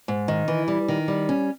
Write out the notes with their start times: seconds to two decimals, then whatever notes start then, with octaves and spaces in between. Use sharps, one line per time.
0.08 G#2
0.28 D#3
0.48 E3
0.68 G3
0.88 D#3
1.08 G3
1.29 C#4